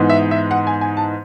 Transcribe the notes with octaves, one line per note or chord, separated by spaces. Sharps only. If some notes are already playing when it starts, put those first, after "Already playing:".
Already playing: G#2 E3 B3 D#4
E5
E5
F#5
G#5
G#5
A5